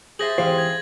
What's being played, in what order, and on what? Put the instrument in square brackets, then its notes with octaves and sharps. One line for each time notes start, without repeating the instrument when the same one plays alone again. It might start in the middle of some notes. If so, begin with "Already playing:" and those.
[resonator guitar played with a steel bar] G4 C5 E5 [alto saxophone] G#4 [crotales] A6 A#6 F#7
[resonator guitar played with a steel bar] G#2 C4 F5 [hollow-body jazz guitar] E3 G4 C5
[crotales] G#6